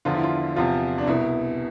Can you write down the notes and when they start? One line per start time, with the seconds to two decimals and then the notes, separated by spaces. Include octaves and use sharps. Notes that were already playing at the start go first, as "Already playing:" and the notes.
0.05 E2 D3 F3 F4
0.15 E4
0.23 F4
0.56 E2 C3 F3 F4
0.98 D4
1.07 C2 B2 E4